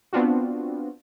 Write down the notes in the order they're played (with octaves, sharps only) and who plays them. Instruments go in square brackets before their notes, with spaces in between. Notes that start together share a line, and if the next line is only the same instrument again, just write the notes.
[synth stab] B3 C4 D4 F4 F#4